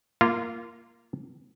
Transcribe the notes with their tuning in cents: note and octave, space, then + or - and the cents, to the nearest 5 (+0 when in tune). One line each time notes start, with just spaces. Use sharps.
A#3 +0 F4 -20